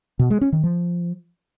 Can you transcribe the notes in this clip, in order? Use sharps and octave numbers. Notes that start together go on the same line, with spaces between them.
B2
G#3
C#4
D#3
F3